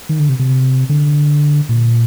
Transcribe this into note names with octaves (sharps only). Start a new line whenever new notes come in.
D#3
D3
C3
C3
D3
A#2